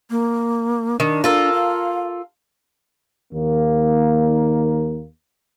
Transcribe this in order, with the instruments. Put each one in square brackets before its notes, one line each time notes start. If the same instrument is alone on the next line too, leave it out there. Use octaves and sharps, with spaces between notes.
[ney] A#3
[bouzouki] D#3 [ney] D4
[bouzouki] F4 A4 A#4
[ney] F5
[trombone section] D#2 D#3 A#3